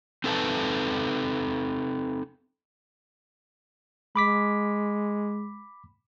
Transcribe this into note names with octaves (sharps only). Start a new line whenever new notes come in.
C4 D#4 A4 B4 G#5 A5
G#3 B5 D6 B6